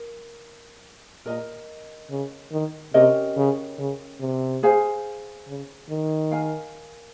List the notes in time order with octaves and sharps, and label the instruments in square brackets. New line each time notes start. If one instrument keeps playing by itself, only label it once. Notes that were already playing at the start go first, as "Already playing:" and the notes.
Already playing: [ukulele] A#4
[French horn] A#2 [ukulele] A#4 D#5 A#5
[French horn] C#3
D#3
[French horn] C3 [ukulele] C#4 G4 A#4 D#5
[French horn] C#3
C#3
C3
[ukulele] G#4 C5 F5 G#5
[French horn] C#3
D#3
[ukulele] A#4 F5 G#5